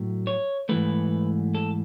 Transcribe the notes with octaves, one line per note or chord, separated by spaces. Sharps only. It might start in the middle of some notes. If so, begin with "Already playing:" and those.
Already playing: A2 F#3 A3
C#5
G#2 E3 A3 B4
A4